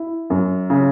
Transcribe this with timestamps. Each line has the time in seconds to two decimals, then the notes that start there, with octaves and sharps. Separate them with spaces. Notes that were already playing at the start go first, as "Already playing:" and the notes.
Already playing: E4
0.30 F#2
0.70 C#3